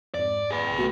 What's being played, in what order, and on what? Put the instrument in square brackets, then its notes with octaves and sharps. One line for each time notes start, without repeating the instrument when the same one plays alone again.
[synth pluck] F2 G#2 [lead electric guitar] D5
[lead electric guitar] G#4 B4
[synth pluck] B1 C#3 G5
[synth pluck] A3 B3 [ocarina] F#4